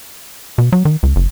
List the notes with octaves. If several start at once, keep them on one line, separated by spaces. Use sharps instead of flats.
B2
F#3
D#3
C#2
F#1